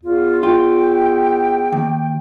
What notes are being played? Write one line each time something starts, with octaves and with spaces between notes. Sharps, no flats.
E2 F4
F4 G5
D#2